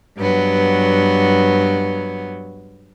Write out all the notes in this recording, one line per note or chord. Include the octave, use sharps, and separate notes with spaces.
G2 F#3 B3